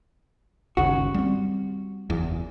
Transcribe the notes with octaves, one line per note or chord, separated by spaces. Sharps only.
G1 D#2 C#3 F#4
G3 C4
F#1 E2